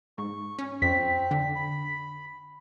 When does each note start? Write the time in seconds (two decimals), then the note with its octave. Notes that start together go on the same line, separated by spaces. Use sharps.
0.18 G#2 C#6
0.59 C#4
0.82 F2 C4 B6
1.31 D3
1.55 B5